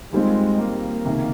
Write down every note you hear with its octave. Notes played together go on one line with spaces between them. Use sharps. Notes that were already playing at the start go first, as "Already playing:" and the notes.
D#2 D#3 G3 G#3 C4 F4
A#3
C#2 C3 D#3